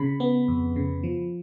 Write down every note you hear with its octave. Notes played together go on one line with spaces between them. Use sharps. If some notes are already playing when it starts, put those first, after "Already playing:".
Already playing: C#3 B5
B3
F2
C#3
F3